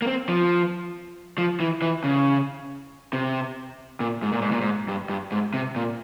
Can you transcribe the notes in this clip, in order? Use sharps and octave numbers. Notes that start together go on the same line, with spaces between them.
A#3
C4
F3
F3
E3
E3
C#3
C3
A#2
G#2
A#2
G#2
A#2
G#2
G2
G2
G#2
C3
A#2